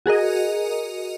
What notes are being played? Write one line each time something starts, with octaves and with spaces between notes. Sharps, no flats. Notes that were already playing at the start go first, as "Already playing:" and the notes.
F#4 G#4 A#4 D#5